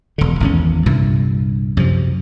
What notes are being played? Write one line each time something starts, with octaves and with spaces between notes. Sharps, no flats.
E1 D3
G#1 E2 C#4
C2 G2 A#2
F#2 C3 F3